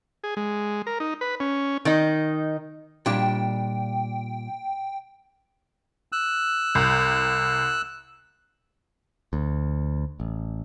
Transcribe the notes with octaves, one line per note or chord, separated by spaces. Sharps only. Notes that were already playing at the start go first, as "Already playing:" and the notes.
G#4
G#3
A#4
D#4
B4
C#4
D#3 D#4
A#2 G3 D4 G5
E6 F#6
C2
D2
A1